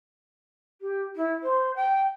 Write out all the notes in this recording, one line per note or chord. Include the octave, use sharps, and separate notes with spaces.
G4
E4
C5
G5